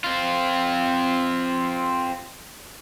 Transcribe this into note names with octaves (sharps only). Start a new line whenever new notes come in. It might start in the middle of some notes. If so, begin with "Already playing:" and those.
C4 F4